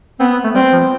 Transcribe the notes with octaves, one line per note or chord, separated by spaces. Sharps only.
B3 C4
B3
A3
G3 C4
F3